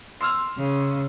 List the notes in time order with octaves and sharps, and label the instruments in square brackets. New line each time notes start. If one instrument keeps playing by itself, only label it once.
[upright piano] C6 E6 F6
[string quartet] C#3